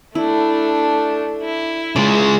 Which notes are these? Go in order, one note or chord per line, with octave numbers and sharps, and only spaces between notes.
A3 D4 E4
E4
C#3 G#3 D5